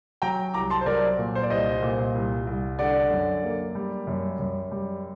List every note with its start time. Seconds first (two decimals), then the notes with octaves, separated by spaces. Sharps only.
0.22 F#3 G5 A#5
0.54 C2 A#5 D6
0.70 A5 C6
0.81 C5
0.86 F#3 A#4 D5
1.18 A#2
1.35 C5
1.43 D5
1.50 C2 C5 D#5
1.82 A#2
2.15 C2
2.47 C2
2.79 D3 D5 F#5
3.11 F#2
3.43 A#3
3.75 G3
4.07 F#2
4.39 F#2
4.71 G3